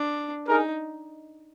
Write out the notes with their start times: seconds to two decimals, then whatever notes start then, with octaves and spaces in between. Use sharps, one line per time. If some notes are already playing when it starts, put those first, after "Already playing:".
Already playing: D4
0.48 D#4 G#4 A#4